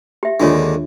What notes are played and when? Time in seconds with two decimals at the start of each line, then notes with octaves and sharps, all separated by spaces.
0.23 G4 E5
0.40 D#2 D3 G#3 D4 F4 C#5